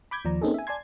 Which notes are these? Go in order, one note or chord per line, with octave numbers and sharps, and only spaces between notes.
B5 D6 G6 G#6
D#2 F3 D5 A#5
A#3 C4 C#4 D#4 G#4 A4
E5 G#5
D5 G#5 A5 C6 G#6